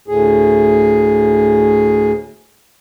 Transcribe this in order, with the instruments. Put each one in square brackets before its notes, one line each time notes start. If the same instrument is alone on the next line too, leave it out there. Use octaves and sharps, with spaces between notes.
[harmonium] D2 A2 G#4